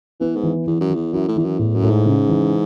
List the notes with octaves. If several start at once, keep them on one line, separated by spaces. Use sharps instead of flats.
E3 B3
G#2
E3
E2 E3
F#2
E3
E2
F#2 E4
A2
E2 E3
F#2
E2 A2
F#2
A2
G#2
C#3
E3